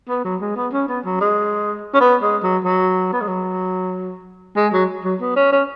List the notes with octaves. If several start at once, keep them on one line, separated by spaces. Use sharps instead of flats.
B3
F#3
G#3
B3
C#4
B3
F#3
G#3
C#4
B3
G#3
F#3
F#3
B3
G#3
F#3
G#3
F#3
F#3
B3
C#4
C#4